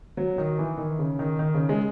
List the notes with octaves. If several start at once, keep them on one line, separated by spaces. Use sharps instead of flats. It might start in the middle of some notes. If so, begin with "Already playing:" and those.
F#3
D#3
E3
D#3
C#3
D#3
D#3
C#3
G#3